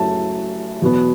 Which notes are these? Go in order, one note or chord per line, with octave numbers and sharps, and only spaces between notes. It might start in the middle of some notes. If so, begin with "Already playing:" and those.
Already playing: F#1 F#2 F#3 A3 E4 A5
E2 B2 F#3 B3